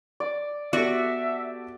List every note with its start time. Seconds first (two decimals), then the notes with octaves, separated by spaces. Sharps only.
0.20 D5
0.73 B3 F#4 G4 A4 D5 E5